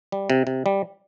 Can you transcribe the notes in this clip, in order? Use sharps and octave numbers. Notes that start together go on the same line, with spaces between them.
G3
C3
C3
G3